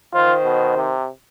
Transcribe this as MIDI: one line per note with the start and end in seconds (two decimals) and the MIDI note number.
0.14 0.94 51
0.14 0.33 65
0.14 0.94 72
0.44 0.76 47
0.77 1.08 48